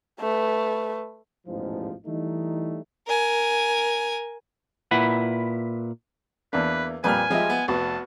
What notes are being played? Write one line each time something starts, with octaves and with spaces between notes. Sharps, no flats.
A3 B4
A1 E2 G#2 B2 F3
E3 G3 A3 D#4
A#4 G#5
A#2 E4 B4 F#5
E2 A#3 D4 B4
F2 A#2 G3 B4 G#5 F6
F3 G3 G#3 G4 D#5 E5
B3
F1 B3 F#4 A5